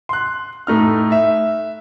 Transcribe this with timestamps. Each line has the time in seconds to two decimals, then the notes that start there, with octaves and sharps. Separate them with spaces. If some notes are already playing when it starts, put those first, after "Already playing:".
0.09 C6 F#6
0.67 A2 A3 D#4 F6
1.12 E5